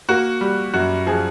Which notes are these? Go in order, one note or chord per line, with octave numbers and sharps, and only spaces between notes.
A#3 F#4
G3
F#2 F#4
F3 G#4